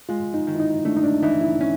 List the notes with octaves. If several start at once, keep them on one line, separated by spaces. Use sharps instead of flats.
G#3 F4
D#4
D#3
E4
D#4
A3 D4
D#4
D4
E3 D#4
E4
C#4